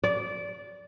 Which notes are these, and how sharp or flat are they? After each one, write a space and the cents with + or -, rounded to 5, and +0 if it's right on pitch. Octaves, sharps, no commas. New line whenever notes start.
D5 -20